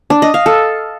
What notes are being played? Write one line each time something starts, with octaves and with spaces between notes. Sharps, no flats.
D4
D#5
F5
A4